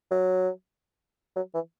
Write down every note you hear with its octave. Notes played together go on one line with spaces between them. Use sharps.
F#3
F#3
E3